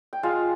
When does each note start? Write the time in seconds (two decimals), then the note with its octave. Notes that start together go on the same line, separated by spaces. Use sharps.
0.13 G5
0.23 G#3 F4 F5